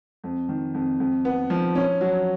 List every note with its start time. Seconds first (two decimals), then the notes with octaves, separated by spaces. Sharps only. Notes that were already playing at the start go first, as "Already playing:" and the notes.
0.24 F2
0.49 D#3
0.74 F2
1.00 F2
1.25 B3
1.50 F3
1.75 C#4
2.01 F#3